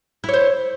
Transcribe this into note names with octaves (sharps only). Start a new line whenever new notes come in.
E4 C5 C#5